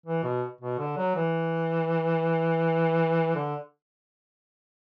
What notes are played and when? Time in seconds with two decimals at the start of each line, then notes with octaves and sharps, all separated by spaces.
0.06 E3
0.23 B2
0.61 B2
0.79 D3
0.97 F#3
1.16 E3
3.35 D3